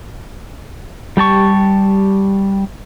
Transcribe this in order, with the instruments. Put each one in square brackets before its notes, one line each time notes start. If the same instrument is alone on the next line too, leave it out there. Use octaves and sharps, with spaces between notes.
[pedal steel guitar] G3 G4 A5 C#6